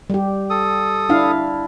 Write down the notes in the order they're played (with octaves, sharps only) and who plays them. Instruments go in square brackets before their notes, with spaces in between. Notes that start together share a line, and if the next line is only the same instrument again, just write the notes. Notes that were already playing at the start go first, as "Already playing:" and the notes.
[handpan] G3 G4
[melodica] A4 D#6
[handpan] D4 E4 F5